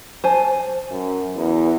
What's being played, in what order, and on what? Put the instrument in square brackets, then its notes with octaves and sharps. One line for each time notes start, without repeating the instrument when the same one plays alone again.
[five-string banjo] C5 G#5 A5
[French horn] F#2
E2